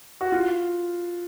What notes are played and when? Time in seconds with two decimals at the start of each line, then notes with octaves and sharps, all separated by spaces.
0.21 F#4
0.32 F4